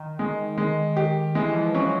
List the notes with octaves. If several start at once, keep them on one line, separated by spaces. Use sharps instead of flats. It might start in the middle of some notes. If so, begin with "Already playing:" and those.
Already playing: D#3
G#3
G#3
G4
E3 G#3
E3
F3
F#3 C#4